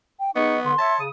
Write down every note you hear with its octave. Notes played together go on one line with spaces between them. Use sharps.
G5
B3 D#4 G#4 D#5 C#6
D3 C6
C#5 E5 A5
C#3 D#6